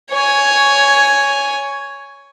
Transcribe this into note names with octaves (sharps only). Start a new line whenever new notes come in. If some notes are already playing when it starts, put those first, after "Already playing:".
C#5 G#5